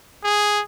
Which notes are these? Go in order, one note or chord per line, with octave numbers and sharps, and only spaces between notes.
G#4